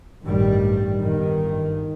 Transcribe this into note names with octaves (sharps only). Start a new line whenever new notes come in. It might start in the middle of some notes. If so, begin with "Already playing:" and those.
A1 G2 D#3 G3
G1 G2 D#3